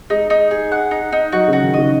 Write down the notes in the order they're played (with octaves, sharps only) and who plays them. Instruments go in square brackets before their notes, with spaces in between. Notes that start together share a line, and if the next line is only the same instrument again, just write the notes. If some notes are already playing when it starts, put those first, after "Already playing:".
[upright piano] G#3 [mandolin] D#4
[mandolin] D#4
G#4
F#5
D#4
D#4
[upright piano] F#3 [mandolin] F#4
[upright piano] C#3 [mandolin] F#4
[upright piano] D#3
[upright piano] C#3 [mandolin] D#5